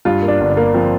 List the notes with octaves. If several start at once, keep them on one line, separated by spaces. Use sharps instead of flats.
G2 F4
A#3
D4
G1
D4
A#3
F3 C4